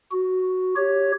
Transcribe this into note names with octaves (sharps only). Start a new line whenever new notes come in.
F#4
G4 C#5